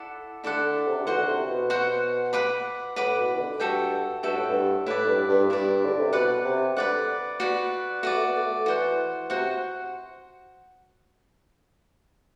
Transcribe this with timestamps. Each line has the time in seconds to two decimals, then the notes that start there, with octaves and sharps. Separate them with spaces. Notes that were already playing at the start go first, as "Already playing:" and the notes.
Already playing: E4 A4 D5 F#5
0.44 D3 E4 A4 D5 F#5
0.87 C3
0.97 D3
1.07 E3 F#4 C5 F#5
1.18 D3
1.28 C3
1.49 B2
1.70 F#4 C5 F#5
2.33 B4 F#5 B5 D6
2.96 A2 B4 F#5 B5 D6
3.18 B2
3.35 E3
3.39 D3
3.60 G2 F#4 A4 E5 G5
4.23 G2 F#4 A4 E5 G5
4.36 A2
4.49 G2
4.86 A2 E4 B4 D5
5.07 G2
5.29 G2
5.49 G2 E4 B4 D5
5.86 D3
5.99 C3
6.12 B2 B4 D5 F#5
6.45 C3
6.76 D3 B4 D5 F#5
7.40 F#4 B4 D5
8.02 A3 F#4 B4 D5
8.16 A3
8.24 B3
8.45 A3
8.65 E3 F#4 C5 F#5
9.30 C3 F#4 C5 F#5